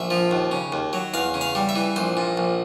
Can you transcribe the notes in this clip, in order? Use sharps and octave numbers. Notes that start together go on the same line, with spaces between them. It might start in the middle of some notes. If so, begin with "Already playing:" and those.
Already playing: A#1 E5
F3
D#2
C#3
D#2
F#3
E2 F5
C#3
F5
G3
E5
E3
A#1 C5
A#2
A#1